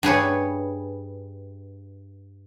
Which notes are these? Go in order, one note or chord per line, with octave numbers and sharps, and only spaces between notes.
G2 G#4 B4 C#5